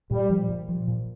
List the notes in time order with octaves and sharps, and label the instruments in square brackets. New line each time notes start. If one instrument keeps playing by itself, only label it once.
[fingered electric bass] A#2 [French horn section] G3
[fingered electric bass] F3
A#2
F3
A#2